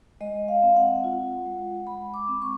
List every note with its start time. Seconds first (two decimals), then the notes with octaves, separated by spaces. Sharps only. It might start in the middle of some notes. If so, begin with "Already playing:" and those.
0.21 G#3 D#5
0.48 F5
0.63 C4
0.76 F#5
1.04 F4
1.45 G#3
1.87 G#3 B5
2.14 D6
2.28 C4
2.42 C#6